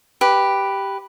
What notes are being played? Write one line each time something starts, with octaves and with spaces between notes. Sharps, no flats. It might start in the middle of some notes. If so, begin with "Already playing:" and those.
G4 B4